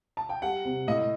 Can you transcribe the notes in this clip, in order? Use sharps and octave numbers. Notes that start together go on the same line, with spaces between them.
A5
G5
G3 F#5
C3
A2 D#5